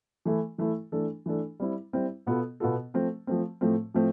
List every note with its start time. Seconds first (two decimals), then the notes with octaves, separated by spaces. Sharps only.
0.25 E3 A3 E4 A4
0.58 E3 A3 E4 A4
0.92 E3 A3 D4 A4
1.26 E3 A3 D4 A4
1.60 G3 C4 E4
1.93 G3 C4 E4
2.27 B2 B3 F4 A4
2.60 B2 B3 F4 A4
2.94 F3 A3 C4
3.27 F3 A3 C4
3.61 A2 F3 A3 C4
3.94 A2 F3 A3 C4